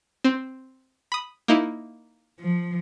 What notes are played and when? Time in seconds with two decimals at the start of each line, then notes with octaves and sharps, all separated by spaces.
0.24 C4
1.12 B5 D#6
1.48 A#3 D#4 E4
2.40 F3